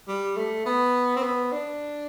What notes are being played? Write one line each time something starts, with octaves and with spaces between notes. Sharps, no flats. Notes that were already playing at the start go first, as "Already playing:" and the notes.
G3
A3
B3
C4
B3
D4